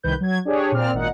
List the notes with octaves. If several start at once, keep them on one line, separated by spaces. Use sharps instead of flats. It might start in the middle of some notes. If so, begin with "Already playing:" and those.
C2 D#3 B4 G6
F#3 G#6
D4 G4 G#4 C#5
A#2 C4 D5 F6
G#1 A#2 D#4 F#5